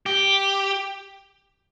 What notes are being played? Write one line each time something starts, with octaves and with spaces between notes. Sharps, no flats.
G4